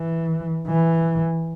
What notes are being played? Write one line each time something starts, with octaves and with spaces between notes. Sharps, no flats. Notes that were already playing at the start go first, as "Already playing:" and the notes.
Already playing: E3
E3